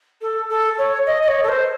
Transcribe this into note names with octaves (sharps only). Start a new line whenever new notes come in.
A4
A4
C#5
D#5
D#5
C#5
A4
C5